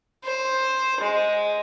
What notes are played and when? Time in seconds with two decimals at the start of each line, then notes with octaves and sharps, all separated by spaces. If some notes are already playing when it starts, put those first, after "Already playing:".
0.24 C5
1.01 G#3